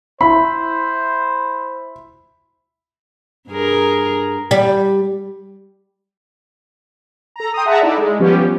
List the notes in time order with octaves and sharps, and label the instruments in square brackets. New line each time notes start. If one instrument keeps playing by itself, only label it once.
[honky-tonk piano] E4 [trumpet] C5 [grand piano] B5
[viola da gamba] G2 G#4 A#4
[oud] G3
[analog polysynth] A4 A#5
G5 C6 D#6
G#4 E5 F#5 A5 A#5
D#4 E4 A4 D5
G#3
F3 G3 B3 C#4 G4